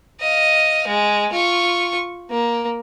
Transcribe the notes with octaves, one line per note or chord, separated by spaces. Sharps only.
D#5 F5
G#3
F4 C#6
A#3